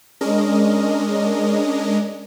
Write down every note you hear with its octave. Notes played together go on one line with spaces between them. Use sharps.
G#3 C#4 D4 A#4 D#5